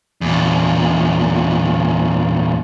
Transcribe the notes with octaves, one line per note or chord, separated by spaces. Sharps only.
E2 A#2